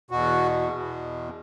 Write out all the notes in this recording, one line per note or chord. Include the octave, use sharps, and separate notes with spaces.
E2 B2 F#4
E2 B2